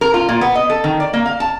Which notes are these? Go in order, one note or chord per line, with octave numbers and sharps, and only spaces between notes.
A#4
F4
A#2
B3
D#5
A4
D#3
D5
A#3
F5
A5